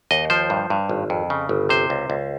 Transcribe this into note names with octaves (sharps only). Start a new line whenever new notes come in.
D#2 D#5
F3 C5
G2
G2
G#1
F2
C#3
G1
C3 C5
C#2
C#2